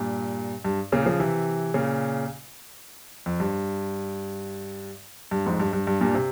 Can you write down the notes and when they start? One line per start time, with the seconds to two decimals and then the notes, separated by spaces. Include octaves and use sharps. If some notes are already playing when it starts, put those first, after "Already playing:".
Already playing: G2 A#2
0.65 G2
0.92 A#2 C#3
1.05 C#3 F3
1.20 C3 E3
1.74 A#2 C#3
3.26 F2
3.40 G2
5.31 G2
5.46 F2 G#2
5.60 G2
5.73 G2
5.87 G2
6.01 G2 A#2
6.14 C3